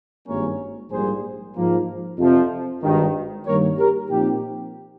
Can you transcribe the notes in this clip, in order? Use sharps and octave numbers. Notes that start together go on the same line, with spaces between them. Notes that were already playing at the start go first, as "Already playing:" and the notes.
G#1 G2 G3 A#3 C#4 A#4 C#5
A#1 G#2 G3 A#3 G#4 C5
G#2 F3 A#3
F2 C3 F3
G#1 G2 D#3
G2 D#3 G3 A#3 A#4 C#5
G4 A#4
A#2 F3 C4 D#4 G4